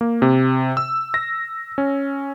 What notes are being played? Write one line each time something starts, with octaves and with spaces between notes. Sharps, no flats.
A#3
C3
E6
A#6
C#4